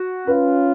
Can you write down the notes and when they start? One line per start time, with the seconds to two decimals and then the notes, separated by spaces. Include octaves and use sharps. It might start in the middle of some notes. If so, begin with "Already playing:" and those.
Already playing: F#4
0.27 C#4 F4 B4